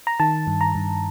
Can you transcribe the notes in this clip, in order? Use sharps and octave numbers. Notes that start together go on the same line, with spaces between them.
A#5
D#3 A5
G2
A#5
G2